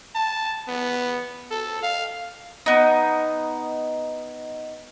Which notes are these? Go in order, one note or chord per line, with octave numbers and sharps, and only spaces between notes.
A5
B3
A4
F5
B3 D#4